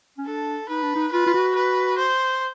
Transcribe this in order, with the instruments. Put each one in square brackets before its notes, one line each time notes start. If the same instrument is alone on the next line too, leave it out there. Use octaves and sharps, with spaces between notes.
[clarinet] C#4
[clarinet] D4 [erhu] A4
[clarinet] D#4 [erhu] B4
[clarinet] D4
D#4
[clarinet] F4 [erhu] B4
[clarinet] F4
F#4
[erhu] B4
C5